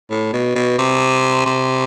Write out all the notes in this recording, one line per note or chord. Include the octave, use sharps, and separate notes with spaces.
A2
B2
B2
C3
C3